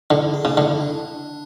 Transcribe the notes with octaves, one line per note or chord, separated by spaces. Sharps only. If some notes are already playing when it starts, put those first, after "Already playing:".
D3 E4
G#4
C#3 D4
D3 E4
D4